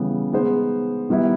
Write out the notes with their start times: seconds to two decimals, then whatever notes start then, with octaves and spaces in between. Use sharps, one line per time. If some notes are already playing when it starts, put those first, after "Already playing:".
Already playing: C#3 E3 G3 B3
0.33 G#3 B3 D#4 G#4 C5
1.09 D#3 G3 B3 E4